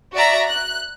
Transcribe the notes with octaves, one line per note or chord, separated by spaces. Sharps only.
F#4 D5 E5 A#5
F#6